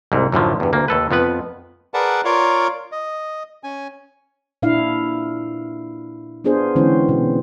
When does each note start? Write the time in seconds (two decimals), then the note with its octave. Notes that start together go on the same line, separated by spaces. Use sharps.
0.12 C2 G#2
0.32 F#2 A2 D3 F3
0.60 E2 G2
0.73 D2 A#3
0.88 D#2 A4 B4
1.11 F2 F3 B3 B4
1.94 G#4 A#4 B4 D5 F#5 A5
2.25 F4 A#4 C#5 D5 F5
2.92 D#5
3.63 C#4 G#5
4.62 A#2 D4 E4 F5
6.44 B3 D4 F4 G#4 C5
6.75 D3 E3 G#3 C4 C#4 C5
7.09 B2